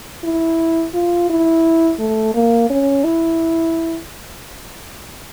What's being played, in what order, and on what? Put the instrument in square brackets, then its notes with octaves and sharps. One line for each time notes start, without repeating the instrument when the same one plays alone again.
[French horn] E4
F4
E4
A3
A#3
C#4
E4